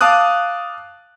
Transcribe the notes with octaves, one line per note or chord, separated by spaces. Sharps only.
F5 A5 D6 D#6 F#6